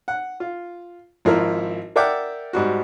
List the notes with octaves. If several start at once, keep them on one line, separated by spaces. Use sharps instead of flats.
F#5
F4
G#1 F3 E4 A#4
A#4 D5 E5 F#5 G5 D6
G#2 G3 F#4